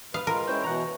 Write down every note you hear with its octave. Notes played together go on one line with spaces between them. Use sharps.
B4 F5 D#6
G#3 F4 A#4
G#3 C#4 E4 C5 C#5 G5
B2 E3 F#5 A#5